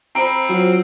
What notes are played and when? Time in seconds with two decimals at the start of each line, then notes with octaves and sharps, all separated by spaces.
0.15 C4 C5 A#5 B5
0.49 F#3 F4 C5